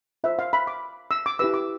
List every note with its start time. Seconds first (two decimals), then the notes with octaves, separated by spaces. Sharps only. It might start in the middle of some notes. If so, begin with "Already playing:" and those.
0.24 F4 C5 E5
0.39 F5
0.53 B5
0.67 D6
1.11 E6
1.26 D6
1.39 E4 G4 B4 E6
1.54 D6